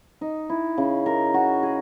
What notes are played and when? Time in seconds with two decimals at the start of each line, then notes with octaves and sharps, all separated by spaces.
0.21 D#4
0.49 E4
0.78 C#3
1.06 A#4
1.34 F#4
1.63 G#4